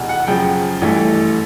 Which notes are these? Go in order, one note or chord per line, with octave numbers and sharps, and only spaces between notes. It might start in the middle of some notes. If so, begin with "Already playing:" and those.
Already playing: F1 E2 B2
F#5
F#2 C#3 F3 G5
A1 G2 E3 A3